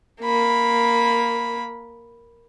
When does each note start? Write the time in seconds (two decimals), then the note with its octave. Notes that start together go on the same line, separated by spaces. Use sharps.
0.21 A#3 B5